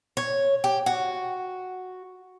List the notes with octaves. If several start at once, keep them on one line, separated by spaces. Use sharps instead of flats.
C#5
G4
F#4